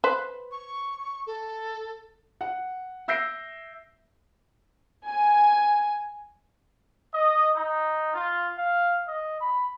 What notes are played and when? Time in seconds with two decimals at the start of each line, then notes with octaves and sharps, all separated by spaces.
0.04 B4 C5
0.51 C#6
1.27 A4
2.41 F#5
3.08 E5 E6 G6 A#6 C7 D7
5.07 G#5
7.13 D#5
7.53 D#4
8.13 F4
8.57 F5
9.06 D#5
9.39 B5